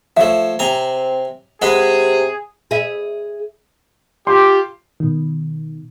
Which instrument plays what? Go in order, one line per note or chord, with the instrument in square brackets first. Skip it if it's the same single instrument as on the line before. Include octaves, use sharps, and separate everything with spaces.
[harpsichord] F3 A3 [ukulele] C#5 E5
[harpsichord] C3 G#5 A#5 [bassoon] C4
[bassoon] C3 [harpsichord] G#3 F#4 B4 [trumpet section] G#4
[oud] G#4 E5
[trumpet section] F4 G4 [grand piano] C6
[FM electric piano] B2 D#3